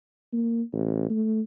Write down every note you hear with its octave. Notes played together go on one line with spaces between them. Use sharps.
A#3
A1
A3